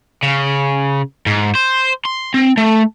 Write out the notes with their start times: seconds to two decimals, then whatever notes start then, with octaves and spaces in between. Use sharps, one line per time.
0.23 C#3
1.26 G#2
1.55 C5
2.05 C6
2.34 C4
2.57 A3